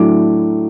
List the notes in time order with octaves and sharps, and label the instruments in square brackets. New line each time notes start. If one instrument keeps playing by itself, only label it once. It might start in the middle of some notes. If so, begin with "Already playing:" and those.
Already playing: [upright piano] A2 F#3 A3 D4 D6